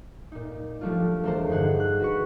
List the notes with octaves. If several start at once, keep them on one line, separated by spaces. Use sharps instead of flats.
A#2 D#4
F3 G3 A3 D4 F4
E1 A3 A4 A#4 C5
G2 D3 D#4 G#4 F#5
F#6
F#4 B4 C#6